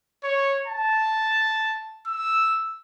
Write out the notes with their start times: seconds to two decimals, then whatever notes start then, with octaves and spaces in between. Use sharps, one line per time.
0.24 C#5
0.67 A5
2.07 E6